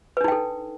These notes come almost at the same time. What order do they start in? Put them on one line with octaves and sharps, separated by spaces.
B4 D4 D#4 G5 A4